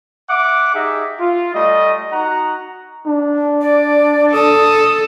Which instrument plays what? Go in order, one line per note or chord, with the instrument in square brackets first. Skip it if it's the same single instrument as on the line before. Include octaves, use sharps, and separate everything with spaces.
[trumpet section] E5 F#5 D6
D#4 G4 G#4 D#5 E5
F4
G3 A3 D#5
D#4 F#4 F#5 A#5
[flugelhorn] D4
[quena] D5
[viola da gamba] A4 [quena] D#6